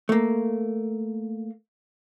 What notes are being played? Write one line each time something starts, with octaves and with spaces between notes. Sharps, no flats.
A3 A#3